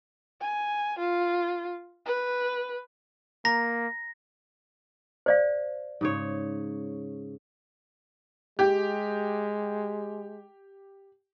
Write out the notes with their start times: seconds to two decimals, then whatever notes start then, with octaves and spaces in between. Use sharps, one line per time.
0.41 G#5
0.99 F4
2.06 B4
3.45 A#3 A#5 A#6
5.26 C5 D5 F5
6.01 G#2 C#3 C#5
8.59 G#3 G4